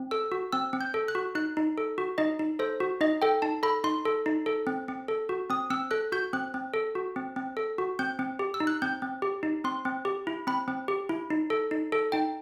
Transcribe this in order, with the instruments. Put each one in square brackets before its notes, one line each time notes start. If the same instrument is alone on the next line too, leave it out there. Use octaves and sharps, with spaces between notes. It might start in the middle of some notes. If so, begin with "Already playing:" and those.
Already playing: [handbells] C4
A4 E6
F#4
C4 E6
C4
G6
A4
F#6
F#4
D#4 F#6
D#4
A4
F#4
D#4 D#5
D#4
A4 C5
F#4
D#4 D#5
A4 G5
D#4 A5
A4 B5
D#4 C6
A4
D#4
A4
C4
C4
A4
F#4
C4 D#6
C4 E6
A4 F#6
F#4 G6
C4 F#6
C4
A4
F#4
C4
C4
A4
F#4
C4 G6
C4
G4
E6
D#4
F#6
C4 G6
C4
G4
D#4
C4 C6
C4
G4
E4
C4 B5
C4
G4
E4
D#4
A4
D#4
A4
D#4 G5